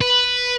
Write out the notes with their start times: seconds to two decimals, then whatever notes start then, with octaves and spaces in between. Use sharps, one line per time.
0.01 B4